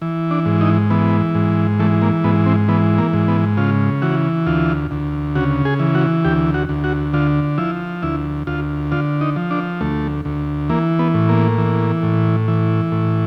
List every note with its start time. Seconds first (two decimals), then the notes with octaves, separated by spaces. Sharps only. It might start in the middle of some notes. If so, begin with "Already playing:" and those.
0.02 E3
0.31 D4
0.46 G#2
0.61 D#4
0.90 E3 B3
1.35 G#2
1.79 E3 A3
2.02 A#3
2.24 G#2 B3
2.46 C4
2.69 E3 B3
2.98 A#3
3.13 G#2
3.28 B3
3.57 C#3 F4
4.02 E3 F#4
4.47 D2 F4
4.91 D2
5.35 C#3 F#4
5.65 G#4
5.79 E3
5.95 F#4
6.24 D2 G4
6.54 F#4
6.69 D2
6.84 F#4
7.13 D3 F4
7.58 F3 E4
8.02 D2 E4
8.47 D2 F4
8.91 D3 F4
9.21 D#4
9.36 F3
9.51 D4
9.81 D2 A3
10.25 D2
10.70 E3 A#3
10.99 B3
11.14 A2
11.29 A#3
11.58 E3
12.03 A2
12.48 E3
12.92 A2